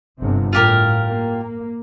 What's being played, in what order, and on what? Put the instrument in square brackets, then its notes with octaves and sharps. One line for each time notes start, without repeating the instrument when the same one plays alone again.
[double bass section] G1 C3
[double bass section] A2 [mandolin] F4 G4 A#4
[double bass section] A#3